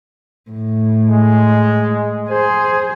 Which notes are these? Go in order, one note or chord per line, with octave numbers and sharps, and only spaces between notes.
A2
G#3
G#4 C5